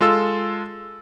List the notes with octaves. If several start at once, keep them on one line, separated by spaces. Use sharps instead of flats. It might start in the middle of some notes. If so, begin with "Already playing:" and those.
G#3 F4 A4 E6